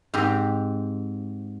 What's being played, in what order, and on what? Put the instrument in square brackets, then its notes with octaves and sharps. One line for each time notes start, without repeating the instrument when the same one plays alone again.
[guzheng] G#2 C4 G4 A#5